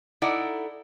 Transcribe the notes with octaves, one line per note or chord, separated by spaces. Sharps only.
D#4 E4 A4 D5 F#5